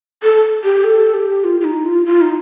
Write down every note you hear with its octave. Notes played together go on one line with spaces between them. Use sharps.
A4
G4
A4
G4
F4
F4
D#4
F4
F4
D#4